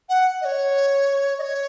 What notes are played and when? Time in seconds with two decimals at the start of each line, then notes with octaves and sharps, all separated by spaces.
0.09 F#5
0.41 D#5
0.44 C#5
1.38 D#5
1.41 C#5